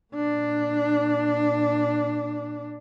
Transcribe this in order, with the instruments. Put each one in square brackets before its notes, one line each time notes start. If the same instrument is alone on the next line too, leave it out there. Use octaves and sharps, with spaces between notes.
[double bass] A#2 D4